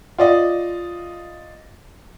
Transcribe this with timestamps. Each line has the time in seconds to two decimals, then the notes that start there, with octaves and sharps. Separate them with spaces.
0.18 F4 D5 D#5